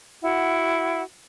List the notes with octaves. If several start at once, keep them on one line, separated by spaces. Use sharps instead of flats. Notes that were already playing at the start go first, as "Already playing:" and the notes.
E4 F#4 F#5